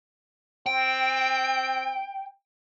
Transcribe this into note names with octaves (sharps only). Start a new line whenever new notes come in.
C4 G5